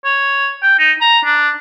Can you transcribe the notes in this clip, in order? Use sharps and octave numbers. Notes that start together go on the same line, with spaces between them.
C#5
G5
D#4
A#5
D4